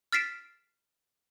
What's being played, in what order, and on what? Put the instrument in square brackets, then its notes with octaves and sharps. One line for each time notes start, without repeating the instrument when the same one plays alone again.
[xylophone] F6 A6 B6 C7 D7 E7